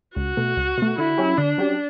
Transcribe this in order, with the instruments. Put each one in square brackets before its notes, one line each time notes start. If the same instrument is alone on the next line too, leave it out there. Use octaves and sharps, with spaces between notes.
[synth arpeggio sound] C#2 [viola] F#4
[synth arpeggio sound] B2 A3
C#2
B2 A3
[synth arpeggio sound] D3 [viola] E4
[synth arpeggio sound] F#3 C#4 G4
[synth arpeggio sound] D3 [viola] D4
[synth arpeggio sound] F#3 C#4 G4